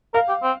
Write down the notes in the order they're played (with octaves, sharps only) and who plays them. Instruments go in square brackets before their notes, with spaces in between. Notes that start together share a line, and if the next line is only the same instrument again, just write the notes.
[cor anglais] A#4 [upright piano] F5
[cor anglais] G4
C4